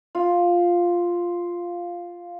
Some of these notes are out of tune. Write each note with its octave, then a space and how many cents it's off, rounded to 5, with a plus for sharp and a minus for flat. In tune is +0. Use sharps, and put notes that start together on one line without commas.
F4 +0